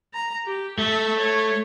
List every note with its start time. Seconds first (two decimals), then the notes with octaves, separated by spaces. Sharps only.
0.14 A#5
0.45 G4
0.78 A3 E5
1.19 C#5